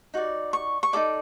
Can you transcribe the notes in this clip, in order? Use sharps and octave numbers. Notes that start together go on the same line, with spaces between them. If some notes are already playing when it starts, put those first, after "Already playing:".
D#4 F#4 D5
C#6
C#6
D#4 F#4 A4 D5 D6